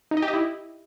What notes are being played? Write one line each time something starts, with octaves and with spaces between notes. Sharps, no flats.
D#4
D#5
G4
D#5
E4